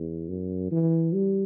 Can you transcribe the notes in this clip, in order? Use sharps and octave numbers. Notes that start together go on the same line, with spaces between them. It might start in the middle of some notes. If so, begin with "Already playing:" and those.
Already playing: E2
F#2
E3
G3